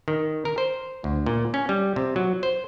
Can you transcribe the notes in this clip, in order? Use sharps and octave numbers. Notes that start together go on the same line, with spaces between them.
D#3
A#4
C5
D2
A#2
C#4
G3
C3
F#3
C5